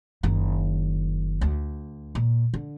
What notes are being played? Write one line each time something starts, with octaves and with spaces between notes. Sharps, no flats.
F#1 D#3
D2
A#2
D3